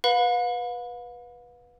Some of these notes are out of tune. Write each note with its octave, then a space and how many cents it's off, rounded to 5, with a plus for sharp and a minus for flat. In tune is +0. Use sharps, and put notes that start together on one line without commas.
B4 -10 F5 +45 B5 +0